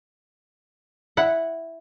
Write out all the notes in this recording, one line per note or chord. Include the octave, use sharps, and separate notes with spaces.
E4 F#5